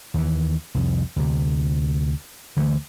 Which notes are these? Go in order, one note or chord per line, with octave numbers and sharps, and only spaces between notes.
D#2 E3
C2 F2
D2 C3
D2 D3 E3 A3